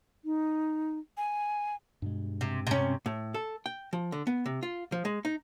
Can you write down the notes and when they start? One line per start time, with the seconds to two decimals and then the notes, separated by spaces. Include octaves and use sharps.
0.25 D#4
1.17 G#5
2.02 G2 B2 G#3
2.41 C3
2.67 C3 C#4
3.06 A2
3.34 A4
3.66 G5
3.93 F3
4.12 D3
4.27 B3
4.46 C3
4.63 F4
4.92 F3
5.05 G#3
5.25 D#4